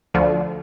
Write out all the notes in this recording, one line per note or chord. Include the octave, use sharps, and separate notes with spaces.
D2 D3 F3